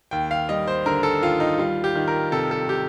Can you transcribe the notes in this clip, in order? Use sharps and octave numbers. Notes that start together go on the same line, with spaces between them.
D#2 G5
F5
G3 D#5
C5
D3 A#4
A4
D#2 F4
D#4
G3 F4
G4
D#3
A#4
C3 A4
A4
G4